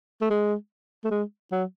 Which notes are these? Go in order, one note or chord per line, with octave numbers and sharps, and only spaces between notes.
A3
G#3
A3
G#3
F#3